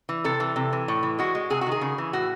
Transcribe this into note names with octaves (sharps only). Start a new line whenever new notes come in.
E3
C3 A4
E3
C3
E3
A2
E3
G#3 F#4
G#3
C3 G#4
F#4
D#3
G#4
C#3
E3
A2 F#4